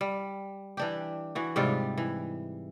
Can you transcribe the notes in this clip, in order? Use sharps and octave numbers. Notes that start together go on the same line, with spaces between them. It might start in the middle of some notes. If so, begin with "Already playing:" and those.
G3
E3 D4 G4
E3 F#4
G#2 C3 G3 F4
E3